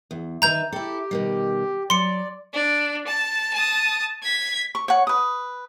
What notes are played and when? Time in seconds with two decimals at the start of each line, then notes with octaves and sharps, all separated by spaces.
0.11 E2
0.42 D#3 B4 E5 A#5 G6 F7
0.72 E4 G4 A4
1.11 B2 D#3 G3
1.90 F#3 D5 C6 C#7
2.53 D4
3.07 A5
3.53 A5 D#6
4.23 G#6 B6
4.75 C#6
4.88 C#5 F#5
5.07 B4 D#6